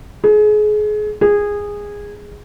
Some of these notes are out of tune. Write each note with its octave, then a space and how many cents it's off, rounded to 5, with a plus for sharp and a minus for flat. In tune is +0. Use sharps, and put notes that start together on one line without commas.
G#4 +30
G#4 -15